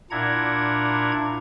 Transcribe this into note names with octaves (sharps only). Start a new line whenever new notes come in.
A#2 D4 E4 F#5 A#5 G#6